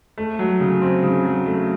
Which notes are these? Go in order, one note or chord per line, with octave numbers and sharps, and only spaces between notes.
A3
F#3
C#3
C4
C#3
F#3
A3